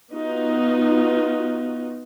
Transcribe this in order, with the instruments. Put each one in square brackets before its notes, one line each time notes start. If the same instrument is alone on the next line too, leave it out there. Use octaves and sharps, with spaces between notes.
[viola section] B3 D#4 F4 F#4